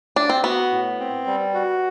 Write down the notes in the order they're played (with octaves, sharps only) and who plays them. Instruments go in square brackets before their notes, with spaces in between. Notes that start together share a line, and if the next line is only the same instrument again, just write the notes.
[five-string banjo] D4
C4
[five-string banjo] B3 [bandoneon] F#4
[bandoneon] A2
C4
G3
F#4